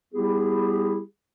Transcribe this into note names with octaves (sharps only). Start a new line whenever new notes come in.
G3 B3 E4 G4 G#4